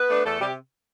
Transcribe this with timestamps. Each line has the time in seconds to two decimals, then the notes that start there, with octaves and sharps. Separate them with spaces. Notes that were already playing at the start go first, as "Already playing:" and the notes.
Already playing: B3 B4
0.09 A3 D4
0.24 E2 A3 A4
0.40 C3 G3 G4